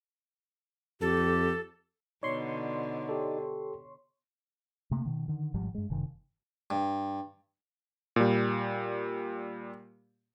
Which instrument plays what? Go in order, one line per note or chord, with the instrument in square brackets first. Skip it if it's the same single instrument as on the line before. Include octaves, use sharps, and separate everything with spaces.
[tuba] F2 [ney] G4 [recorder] A4
[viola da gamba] B2 D3 [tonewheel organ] D#4 D5 [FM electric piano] C#5 C6 C#6
[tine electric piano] G4 A4
[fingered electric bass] C3 A3 A#3
B2 D#3
D3 D#3
G#1 G#2 F3 G3
G2 G#3
F#1 C3 D#3
[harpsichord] G2
[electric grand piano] A#2 G3